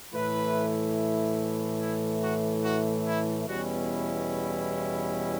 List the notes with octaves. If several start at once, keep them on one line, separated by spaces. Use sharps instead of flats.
A2 E3 A3 E4 B4
E4
F#4
F#4
E4
E2 B2 G3 C#4 E4 F#4